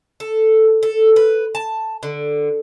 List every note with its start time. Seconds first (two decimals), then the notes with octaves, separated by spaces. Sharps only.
0.20 A4
0.83 A4
1.16 B4
1.55 A5
2.03 D3